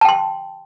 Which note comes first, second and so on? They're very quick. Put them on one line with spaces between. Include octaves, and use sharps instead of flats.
A5 G5 C6